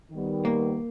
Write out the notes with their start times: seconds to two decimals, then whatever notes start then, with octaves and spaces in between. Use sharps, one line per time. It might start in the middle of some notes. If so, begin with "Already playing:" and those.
0.11 D#3 G3 B3
0.45 A#3